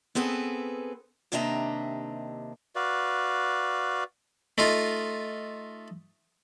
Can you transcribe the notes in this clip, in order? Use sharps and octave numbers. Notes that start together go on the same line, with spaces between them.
B3 C4 G#4 A4 B4
D#2 C3 D4 D#5 E5 A#5
F#4 B4 D5 F5
A3 D#4 F4